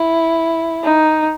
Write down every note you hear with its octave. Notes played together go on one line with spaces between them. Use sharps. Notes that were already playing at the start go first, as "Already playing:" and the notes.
Already playing: E4
D#4